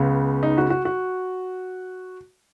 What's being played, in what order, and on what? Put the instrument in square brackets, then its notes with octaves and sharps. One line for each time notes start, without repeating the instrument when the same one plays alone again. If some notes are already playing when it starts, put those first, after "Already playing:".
Already playing: [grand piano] C#2 C#3 B3
D#4
F#4
F#4
F#4